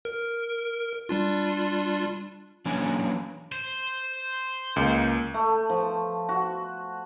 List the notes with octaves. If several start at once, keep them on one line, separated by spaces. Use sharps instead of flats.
A#4
G3 D4 F4
E3 F#3 A#3 C#4 D4 G#5
C5
C#2 A#3
A3
F3
F#4